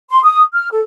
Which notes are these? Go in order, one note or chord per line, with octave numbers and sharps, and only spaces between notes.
C6
D#6
F6
A4